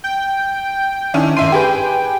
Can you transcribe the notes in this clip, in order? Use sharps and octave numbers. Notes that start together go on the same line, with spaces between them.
G5
D#3 C#4 D4 E4
G#1 E5 C6 D#7
G4 G#4 B4 G5